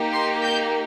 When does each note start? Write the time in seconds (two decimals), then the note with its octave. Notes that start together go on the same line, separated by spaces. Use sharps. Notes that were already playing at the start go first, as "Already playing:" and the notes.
Already playing: A#3 D#4 G4
0.12 C6
0.43 G6